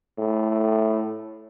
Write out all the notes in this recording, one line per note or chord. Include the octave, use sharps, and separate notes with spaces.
A2